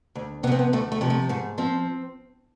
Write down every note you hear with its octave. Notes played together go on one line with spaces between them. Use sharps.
D2
C3 F3 B3 C4
B3
D2 A3
A3
C3 F3
A3
G#2 A3
F3 C4